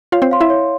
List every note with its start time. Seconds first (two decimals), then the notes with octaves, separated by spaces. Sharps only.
0.12 F4 C#5 F5
0.22 C4 C5
0.31 F5 C6
0.41 E4 E5
0.50 C#5